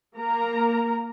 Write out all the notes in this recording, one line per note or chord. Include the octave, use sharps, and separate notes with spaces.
A#3 A#4 A#5